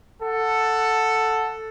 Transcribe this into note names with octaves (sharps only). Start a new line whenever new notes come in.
A4 F#5